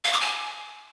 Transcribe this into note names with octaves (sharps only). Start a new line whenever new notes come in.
F5
D6
G#5